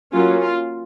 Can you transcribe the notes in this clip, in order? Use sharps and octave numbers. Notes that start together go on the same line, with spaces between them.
F#3 A#3 C#4 F4
F4